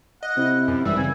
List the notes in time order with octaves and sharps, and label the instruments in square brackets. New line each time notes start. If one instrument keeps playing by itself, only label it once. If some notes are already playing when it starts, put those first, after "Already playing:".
[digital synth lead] D#5 [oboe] F#5
[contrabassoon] C3 [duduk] E4
[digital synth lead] F#2
[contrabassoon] G#1 [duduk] E3 [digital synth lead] G3 [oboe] E5
[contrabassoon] C2 [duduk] C#3 [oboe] G#5